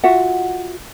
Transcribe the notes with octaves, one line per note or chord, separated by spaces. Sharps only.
F4 F#4 E5 F#5